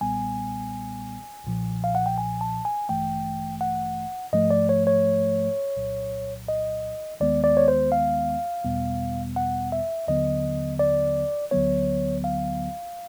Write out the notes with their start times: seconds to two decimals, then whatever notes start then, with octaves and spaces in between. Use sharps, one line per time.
0.01 B1 A#2 G3 B3 G#5
1.45 B1 A#2 F3
1.84 F5
1.95 F#5
2.06 G5
2.18 G#5
2.41 A5
2.65 G#5
2.89 A1 G2 E3 A3 G5
3.61 F#5
4.33 G#2 F3 A3 D#5
4.51 D5
4.69 C#5
4.87 C#5
5.77 C2 A#2 F#3
6.49 D#5
7.20 D#2 D#3 G#3 B3 D5
7.44 D5
7.57 C#5
7.68 C5
7.92 F5
8.64 E2 B2 G3 B3
9.36 F#5
9.72 E5
10.08 D#2 D3 F#3 B3 D#5
10.79 D5
11.51 D2 D3 F#3 B3 C#5
12.24 F5